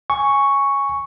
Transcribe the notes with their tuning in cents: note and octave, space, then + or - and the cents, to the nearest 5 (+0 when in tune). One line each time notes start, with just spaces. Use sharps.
G#5 +0 C#6 +0